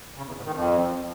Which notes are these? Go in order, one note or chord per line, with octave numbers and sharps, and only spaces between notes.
C#3
E2
G#2
D#3
F2